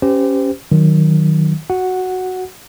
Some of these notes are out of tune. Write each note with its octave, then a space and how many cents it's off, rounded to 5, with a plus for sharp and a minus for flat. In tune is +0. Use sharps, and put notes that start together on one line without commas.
C#4 +0 G4 +0 C5 -40
D#3 +0 F#3 +0
F#4 +0 F#5 +0